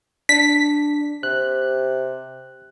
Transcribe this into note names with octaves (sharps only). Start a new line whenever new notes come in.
D4 B6
C3 F#6